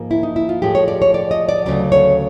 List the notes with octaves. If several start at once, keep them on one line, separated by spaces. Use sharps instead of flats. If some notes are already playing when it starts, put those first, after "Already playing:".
Already playing: G#2 F3 A#3
E4
D#4
E4
F4
A2 F3 G#3 G4
C#5
D5
C#5
D5
D#5
D5
D2 C#3 F#3 D5
C#5